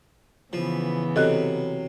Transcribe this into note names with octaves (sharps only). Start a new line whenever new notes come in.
C#3 E3 F3 B3
C3 F#3 A4 D#5 F#6